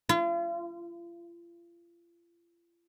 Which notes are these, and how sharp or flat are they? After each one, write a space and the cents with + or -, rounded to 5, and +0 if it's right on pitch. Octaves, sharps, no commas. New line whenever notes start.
F4 -40